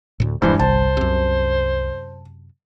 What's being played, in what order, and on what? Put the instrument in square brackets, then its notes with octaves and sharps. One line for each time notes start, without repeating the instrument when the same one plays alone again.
[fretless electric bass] D2 A2
[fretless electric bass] D#1 G#3 D4 [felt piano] G2 E3 [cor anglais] C5
[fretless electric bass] G1 [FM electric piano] C2 [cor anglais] C5 [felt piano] A5
[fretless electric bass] F#2 C3